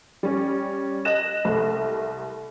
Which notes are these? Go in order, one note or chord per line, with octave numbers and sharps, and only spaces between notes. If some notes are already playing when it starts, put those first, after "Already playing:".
G3 C#4
D#5 F#6 A#6 E7
C2 A3